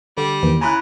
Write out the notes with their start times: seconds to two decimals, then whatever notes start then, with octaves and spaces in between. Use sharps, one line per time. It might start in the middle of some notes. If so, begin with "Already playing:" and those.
0.18 D3 G3
0.43 E2 D#3 E3 A#3
0.61 C#3 E4 G#5 A#5 B5 F#6